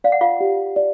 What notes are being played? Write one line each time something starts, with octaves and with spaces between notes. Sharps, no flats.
D5 F5
F#5
F4 F5
G4
D5